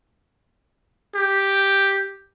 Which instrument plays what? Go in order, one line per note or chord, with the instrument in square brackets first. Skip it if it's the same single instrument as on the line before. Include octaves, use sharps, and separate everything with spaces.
[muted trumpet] G4